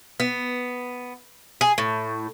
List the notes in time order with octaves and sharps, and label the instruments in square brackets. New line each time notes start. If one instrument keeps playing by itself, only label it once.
[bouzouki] B3
G#4
A2